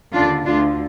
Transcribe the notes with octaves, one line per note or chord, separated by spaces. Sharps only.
D#2 D3 D4 F4
D2 D3 D4 F4